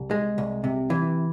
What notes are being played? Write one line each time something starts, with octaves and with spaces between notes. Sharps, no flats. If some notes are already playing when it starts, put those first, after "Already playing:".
Already playing: C2
G#3
C2
C3
E3